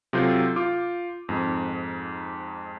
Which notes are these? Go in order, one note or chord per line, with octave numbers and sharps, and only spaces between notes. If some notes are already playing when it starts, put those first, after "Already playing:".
C3 F#3 F4 A4 G6
F4 D6
F2 G#2